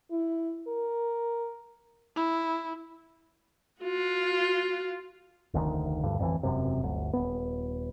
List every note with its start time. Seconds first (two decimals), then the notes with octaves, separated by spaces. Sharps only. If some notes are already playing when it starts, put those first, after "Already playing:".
0.11 E4
0.68 A#4
2.16 E4
3.81 F4 F#4
5.54 F1 D2 B2 D#3
6.03 F1 D2 G2 D3
6.19 A1 F2 D#3 E3
6.43 E1 F#2 C3
6.83 G1 D2
7.13 D#1 B3